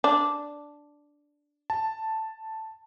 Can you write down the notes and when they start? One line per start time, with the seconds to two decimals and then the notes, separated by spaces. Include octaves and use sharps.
0.04 D4
1.70 A5